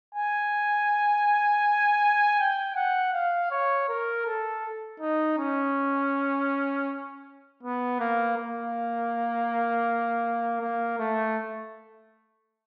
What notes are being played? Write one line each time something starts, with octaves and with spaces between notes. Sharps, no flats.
G#5
G5
F#5
F5
C#5
A#4
A4
D#4
C#4
B3
A#3
A#3
A#3
A3